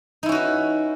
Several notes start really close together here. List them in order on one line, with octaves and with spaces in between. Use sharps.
D#4 E4 C#4 F#4 B4